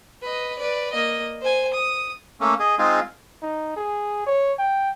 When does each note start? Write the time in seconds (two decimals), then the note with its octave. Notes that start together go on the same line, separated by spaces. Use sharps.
0.22 B4 D#5
0.58 B4 D5
0.93 A#3 D#5
1.41 C5 G#5
1.73 D#6
2.41 A3 A#3 C#4
2.60 G#4 D#5
2.79 G#3 C4 D#4 F4 G#4
3.42 D#4
3.76 G#4
4.26 C#5
4.58 G5